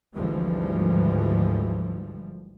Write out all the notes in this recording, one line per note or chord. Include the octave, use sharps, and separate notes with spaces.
G#1 D2 G#2 E3 F3 G3